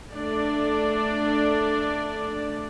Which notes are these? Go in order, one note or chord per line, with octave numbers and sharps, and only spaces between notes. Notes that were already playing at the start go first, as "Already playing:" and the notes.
A3 D4 D5